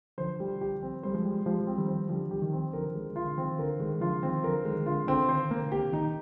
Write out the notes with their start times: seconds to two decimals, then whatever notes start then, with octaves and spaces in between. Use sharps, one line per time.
0.18 D3 F3 C5
0.40 G3
0.61 G4
0.83 C4
1.03 G3 C5
1.14 F3 G#3
1.24 G3
1.46 F3 G#3 G4
1.67 C4
1.78 D#3 G3
1.88 C5
2.09 D3 F3 G3
2.31 G4
2.42 D#3
2.53 C4
2.73 D3 F3 A#4
2.95 G#3
3.16 F4
3.25 D3
3.38 D#3 C4
3.59 D3 A#4
3.79 D#3 G#3
4.01 D3 F3 F4
4.23 D#3 C4
4.44 D3 F3 A#4
4.65 D#3 G#3
4.86 D3 F4
5.07 D3 C4
5.29 D#3 C5
5.51 A#3
5.61 D3
5.72 G4
5.92 D#3 D#4